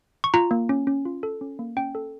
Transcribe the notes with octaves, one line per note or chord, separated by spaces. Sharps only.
C#6
F4 A#5
A#3
C#4
C#4
F4
A4
C#4
A#3
C#4 G5
A4